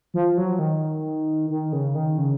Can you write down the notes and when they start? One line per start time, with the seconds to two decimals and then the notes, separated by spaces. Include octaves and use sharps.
0.14 F3
0.38 F#3
0.59 D#3
1.50 D#3
1.73 C#3
1.95 D#3
2.18 C#3